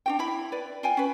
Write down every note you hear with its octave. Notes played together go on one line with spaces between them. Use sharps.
D4 F#4 G5
E4 B5
B4 D5
F4 G5 G#5
C#4 B4